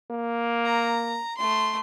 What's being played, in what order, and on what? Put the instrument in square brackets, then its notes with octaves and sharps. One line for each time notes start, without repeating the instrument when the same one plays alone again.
[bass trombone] A#3
[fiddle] A#5
A3 C6